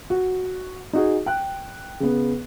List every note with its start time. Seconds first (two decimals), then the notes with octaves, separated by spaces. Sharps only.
0.10 F#4
0.93 D#4 F#4 G#4
1.26 G5 F#6
2.00 C#3 B3